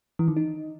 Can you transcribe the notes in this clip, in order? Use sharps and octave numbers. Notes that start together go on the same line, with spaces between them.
E3
D#3
D#4